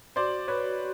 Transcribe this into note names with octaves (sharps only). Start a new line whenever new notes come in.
F#4 C5 D5
B4 C#5